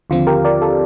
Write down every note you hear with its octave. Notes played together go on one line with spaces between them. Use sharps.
D#2 D3 F3 C4 F4
G4 A#4
A#4 D5
F4 A4